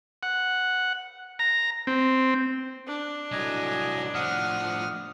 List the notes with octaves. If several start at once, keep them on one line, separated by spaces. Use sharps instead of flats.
F#5
A#5
C4
D4
C2 A2 F#3 D#5 G#5
A2 F3 F#5 D#6 F6